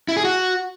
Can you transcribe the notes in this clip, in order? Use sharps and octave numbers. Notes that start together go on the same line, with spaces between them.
E4
G#4
F#4